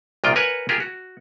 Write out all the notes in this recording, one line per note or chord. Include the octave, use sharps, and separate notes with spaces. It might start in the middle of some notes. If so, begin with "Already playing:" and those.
C2 A#2 D#3 F4 G5
A#4 B4 C#5 F#5 G#5
F4 G4 G#4 A#4
F#4